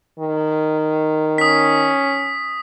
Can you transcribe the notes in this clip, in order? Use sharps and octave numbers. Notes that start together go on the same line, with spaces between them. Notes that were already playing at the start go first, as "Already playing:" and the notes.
D#3
C#4 D#6 B6